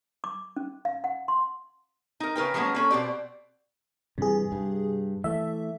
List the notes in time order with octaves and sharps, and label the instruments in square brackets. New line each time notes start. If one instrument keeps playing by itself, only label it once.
[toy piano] D6
C#4
F5
F#5
C6
[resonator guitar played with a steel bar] D#4 A#4
C#3 A#4 B4 G5
F3 F#3 G#3 A#3 B3 C#4
A#3 C#4 A4
B2 C4 G4 D5
[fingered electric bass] G2 E3 [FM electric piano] C3 G#4
[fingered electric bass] G2
[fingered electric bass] E3 A3 [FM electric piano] E5